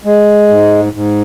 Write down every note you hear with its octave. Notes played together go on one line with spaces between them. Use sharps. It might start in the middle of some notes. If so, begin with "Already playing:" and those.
G#3
G#2
G#2